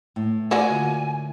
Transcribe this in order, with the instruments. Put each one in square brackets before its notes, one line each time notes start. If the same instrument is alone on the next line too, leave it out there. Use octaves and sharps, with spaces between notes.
[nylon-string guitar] A2
[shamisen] A#3 F#4 D5 [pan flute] G#5
[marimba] D3 F4